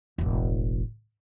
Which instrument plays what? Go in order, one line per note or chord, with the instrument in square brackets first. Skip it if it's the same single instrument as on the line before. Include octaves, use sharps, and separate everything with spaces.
[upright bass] E1 A1